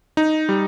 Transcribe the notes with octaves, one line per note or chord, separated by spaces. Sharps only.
D#4
G3